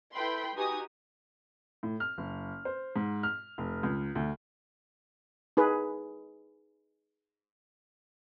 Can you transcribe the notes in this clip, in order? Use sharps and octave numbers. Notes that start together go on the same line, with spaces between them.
E4 A4 B4 G5 B5 C6
D#4 F#4 G4 B4 G#5 D#6
A2
F6
F#1
C5
G#2
F6
F1
C#2
D2
D#4 G#4 B4